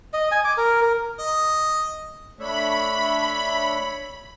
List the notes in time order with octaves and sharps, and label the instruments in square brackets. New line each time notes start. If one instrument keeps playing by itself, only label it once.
[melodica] D#5
G#5
D6
A#4
A#4
[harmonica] D#5
[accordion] A3 D4 E5 [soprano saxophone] C#5 [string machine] B5